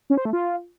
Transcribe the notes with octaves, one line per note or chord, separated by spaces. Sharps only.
C#4
C5
A3
F4